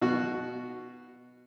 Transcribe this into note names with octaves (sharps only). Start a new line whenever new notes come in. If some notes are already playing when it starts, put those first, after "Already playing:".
B2 F#4